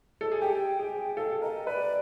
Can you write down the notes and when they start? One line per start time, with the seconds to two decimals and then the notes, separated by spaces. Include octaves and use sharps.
0.21 A4
0.32 G#4
0.42 G4 G5
0.79 G#4
1.16 A4 F5
1.41 A#4 D#5
1.67 B4 D5